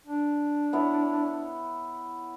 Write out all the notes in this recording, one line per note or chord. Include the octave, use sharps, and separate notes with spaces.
D4
B3 E4 C#5